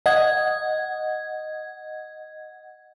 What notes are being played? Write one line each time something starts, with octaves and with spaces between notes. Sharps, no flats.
D#5 F#5 G#6